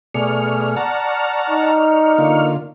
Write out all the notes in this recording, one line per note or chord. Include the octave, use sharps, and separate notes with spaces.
B2 A3 G#4 D5 C#6 F6
F#5 A5 A#5
D#4
D3 A#3 F4